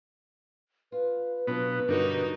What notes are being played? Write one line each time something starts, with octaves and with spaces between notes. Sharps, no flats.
F4 B4
B2 F#3 B3 D4 F4
G2 D3 D#4 F#4 A#4 C#5